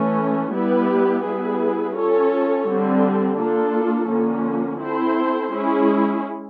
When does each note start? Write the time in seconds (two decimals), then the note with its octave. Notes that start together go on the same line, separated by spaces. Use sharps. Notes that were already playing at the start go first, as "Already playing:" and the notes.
Already playing: E3 A3 C#4
0.52 G3 B3 E4 G4 B4
1.24 G3 B3 E4 G#4 B4
1.95 C#4 F4 A4 C#5
2.66 D3 G3 C4
3.37 A#3 D4 F4 A4
4.08 D3 F3 A#3 C#4
4.78 C4 E4 A4 C5
5.50 G#3 C#4 E4 G#4